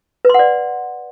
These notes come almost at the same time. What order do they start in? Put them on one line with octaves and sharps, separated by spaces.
B4 C6 F#5 D5